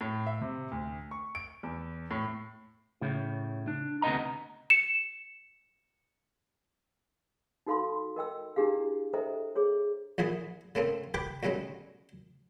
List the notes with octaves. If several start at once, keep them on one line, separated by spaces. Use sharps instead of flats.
A2
E5
C3
D2
C#6
D7
E2
A2
A2 C#3
D4
D2 C3 B3 D#5 A#5
C#7 E7
D#4 F#4 A4 F5 B5 C6
A#4 D#5 G5 E6
D4 E4 G4 G#4 F5
A4 C5 D#5 E5 G5 A#5
G#4 C#5
A#1 A#2 E3 G#4
C#3 A3 A#3 C4
G4 B4 G5 D6
D2 B2 G3 G#3 C#4